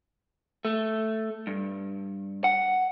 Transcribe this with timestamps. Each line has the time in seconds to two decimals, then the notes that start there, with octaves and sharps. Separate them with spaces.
0.65 A3
1.47 G2
2.44 F#5